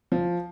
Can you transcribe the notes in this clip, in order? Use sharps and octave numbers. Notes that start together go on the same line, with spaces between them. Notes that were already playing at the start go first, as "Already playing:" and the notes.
F3